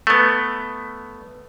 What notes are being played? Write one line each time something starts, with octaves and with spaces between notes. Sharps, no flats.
A3 B3